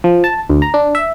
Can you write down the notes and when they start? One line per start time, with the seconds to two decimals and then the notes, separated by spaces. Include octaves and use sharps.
0.04 F3
0.24 A5
0.49 D2
0.62 A#5
0.74 D4
0.95 E5